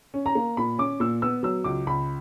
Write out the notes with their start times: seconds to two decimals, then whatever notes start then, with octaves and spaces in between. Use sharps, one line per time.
0.14 C#4
0.26 A#5
0.35 A#3
0.57 A#2 B5
0.78 C#4 D6
1.00 A#2 E6
1.22 B3 E6
1.43 F#3 E6
1.64 C#2 D6
1.87 C#2 B5